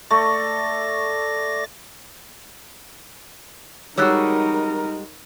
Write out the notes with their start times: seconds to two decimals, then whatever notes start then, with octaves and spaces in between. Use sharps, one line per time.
0.11 A3 D5 C#6 D6 A#6
3.97 G3 G#3 D#4 F#4 A#4 C#5 E6 F#6